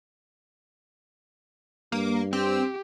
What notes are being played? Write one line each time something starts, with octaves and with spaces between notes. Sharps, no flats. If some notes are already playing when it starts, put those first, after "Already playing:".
G2 A#3
C4 G4